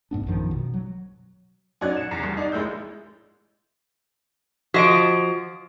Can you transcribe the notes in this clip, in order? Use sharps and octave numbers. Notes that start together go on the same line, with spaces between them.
A1 G#2 B3 D4
A#1 F#2 D#3 F3
B2
F#3
F#3 C#4 D#4 D5 F#6 G#6
C#7 E7
E2 A#5 C7
C2
D#4 D5
A1 G#3 E4 E6 G6
F3 F#4 D#5 D7